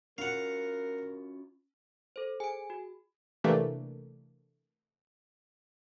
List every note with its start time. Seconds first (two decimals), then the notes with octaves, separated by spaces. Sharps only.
0.18 C#4 F4 F#4 A#4 F5 F#5
2.16 A4 C5
2.40 G#4 G#5 D7
2.70 F#4
3.44 C3 E3 A3 A#3 D4